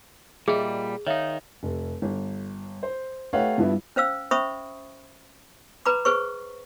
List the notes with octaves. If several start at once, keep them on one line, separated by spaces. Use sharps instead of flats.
A#2 G3 G#4 D#5 E5
D#3 D#4 C#5 E5 F5
F1
G1
C5
A3 G4 B4 C#5 F5 F#5
G2 F3 B3 E4
C#4 C5 F5 E6
C#4 C5 E5 B5 C#6 D#6
B4 A#5 B5 D6
G#4 B4 C5 C#6